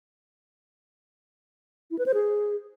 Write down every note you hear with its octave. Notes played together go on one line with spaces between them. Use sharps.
E4
B4
C5
G#4